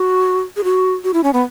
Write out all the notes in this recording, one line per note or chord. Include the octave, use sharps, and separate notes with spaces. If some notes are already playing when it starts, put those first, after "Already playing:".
Already playing: F#4
G#4
F#4
F#4
E4
C#4
B3